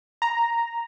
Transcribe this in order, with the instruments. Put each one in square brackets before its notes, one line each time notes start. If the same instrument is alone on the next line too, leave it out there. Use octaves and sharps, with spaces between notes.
[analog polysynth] A#5